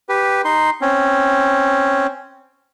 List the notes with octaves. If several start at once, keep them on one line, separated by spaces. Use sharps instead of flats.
G4 B4
D#4 C6
C4 C#4